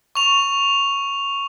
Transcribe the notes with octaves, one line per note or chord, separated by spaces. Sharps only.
C#6 F7